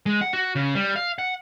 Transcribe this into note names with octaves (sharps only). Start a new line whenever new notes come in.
G#3
F#5
F#4
C#3
G3
F5
F#5